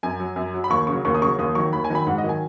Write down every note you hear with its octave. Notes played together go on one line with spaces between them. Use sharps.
F#2 G#5
F#3
F#2
F#3
B5
D#2 C#6
C#3 F#3 C#6
D#2 C#6
D#6
C#3 F#3 C#6
D#2 D#6
D#3 F#3 C#6
D#2 B5
G#5
D#3 F#3 B5
G#2 F#5
D#5
D#3 F#3 G#5